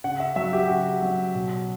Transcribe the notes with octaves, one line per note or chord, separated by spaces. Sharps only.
C#3 F#5
E5
F#3 E5
G4
C#3 F#4
F#3
B2